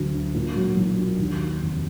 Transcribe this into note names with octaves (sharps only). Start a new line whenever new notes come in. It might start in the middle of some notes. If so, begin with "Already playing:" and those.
Already playing: D2 D3 F#3
D4
A#2
F#3
B1
D4
D#2
D#3
F1